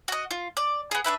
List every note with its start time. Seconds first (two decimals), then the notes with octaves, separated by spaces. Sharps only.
0.08 F#4 D#5
0.31 F4
0.57 D5
0.91 B3 G#4
1.04 D4 F#4 B4 E5